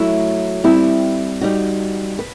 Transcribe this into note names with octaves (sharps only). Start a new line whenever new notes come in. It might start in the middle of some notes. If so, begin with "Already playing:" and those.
Already playing: F#3 A3 E4
G3 C4 E4
G3 D#4 F#4
B4